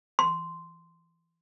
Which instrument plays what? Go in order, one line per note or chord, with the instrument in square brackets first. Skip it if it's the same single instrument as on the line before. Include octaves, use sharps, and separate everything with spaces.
[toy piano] C6